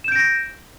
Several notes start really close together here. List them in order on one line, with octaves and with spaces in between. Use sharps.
E7 G6 D7 A#6